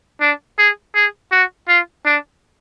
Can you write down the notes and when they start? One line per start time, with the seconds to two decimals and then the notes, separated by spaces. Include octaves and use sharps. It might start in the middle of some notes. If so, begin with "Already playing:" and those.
0.21 D4
0.58 G#4
0.95 G#4
1.32 F#4
1.68 F4
2.05 D4